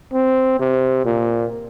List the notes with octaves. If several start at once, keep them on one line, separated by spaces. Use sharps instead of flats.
C4
C3
A#2